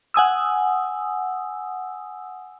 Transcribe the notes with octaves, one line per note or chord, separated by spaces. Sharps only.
F#5 G#5 D#6 E6